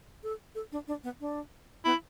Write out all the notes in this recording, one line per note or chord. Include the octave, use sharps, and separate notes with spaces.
A4
A4
D4
D4
B3
D4
B3 E4